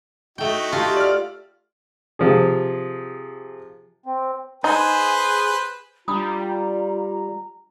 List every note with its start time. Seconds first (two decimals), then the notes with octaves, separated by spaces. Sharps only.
0.38 A3 D#4 E4 F#4 G5
0.72 F4 G4 A4
0.97 D5 F6
2.19 C3 F3 G#4
4.06 C4
4.64 D#4 G#4 B4 C5
6.08 G3 D4 F4 A#5 B5 D#6